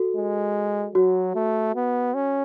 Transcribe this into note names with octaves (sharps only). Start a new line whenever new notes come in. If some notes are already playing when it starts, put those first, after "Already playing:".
Already playing: F#4 A4
G#3
F#3 F#4
A3
B3
C#4